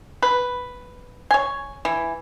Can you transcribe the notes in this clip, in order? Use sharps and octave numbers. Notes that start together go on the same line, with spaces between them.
B4
C#5 G#5
E3